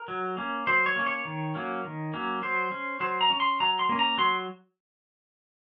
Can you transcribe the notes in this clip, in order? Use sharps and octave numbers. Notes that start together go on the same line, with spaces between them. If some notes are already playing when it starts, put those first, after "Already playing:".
Already playing: A#4
F#3
A#3 C#4
F#3 C5
C#5
A#3 C#4
C#5
D#3
F#3 A#3 C#4
D#3
F#3 A#3 C#4
F#3 C5
C#4
F#3 C5
A#5
C#4
C6
F#3 A#5
C6
A#3 C#4
A#5
F#3 C6